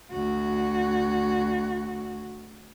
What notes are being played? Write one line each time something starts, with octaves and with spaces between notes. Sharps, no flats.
D2 F#4